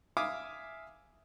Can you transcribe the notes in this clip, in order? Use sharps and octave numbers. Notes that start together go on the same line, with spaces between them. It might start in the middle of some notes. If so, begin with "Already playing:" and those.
E5 F5 G#5 D6 D#6